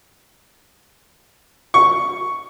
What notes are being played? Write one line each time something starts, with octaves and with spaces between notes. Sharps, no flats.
C#6